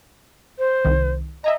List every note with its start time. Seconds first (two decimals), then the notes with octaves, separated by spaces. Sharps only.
0.59 C5
0.85 C2 D#3
1.44 D#5 E5 G#5 A#5